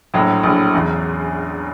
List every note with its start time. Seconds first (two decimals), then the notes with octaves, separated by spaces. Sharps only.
0.14 A#1 A2 F#3
0.43 A#1 A2 F#3
0.74 E2 C#3 F#3